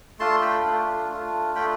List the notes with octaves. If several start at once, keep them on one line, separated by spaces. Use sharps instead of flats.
A3 D4 F4 A5 C6
G5 B5
A3 D4 F4
A3 D4 F4
A3 D4 F4 G5 B5